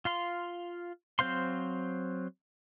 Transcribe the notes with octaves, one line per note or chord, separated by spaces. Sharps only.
F4 F5 C6
F#3 C4 C5 F5 C6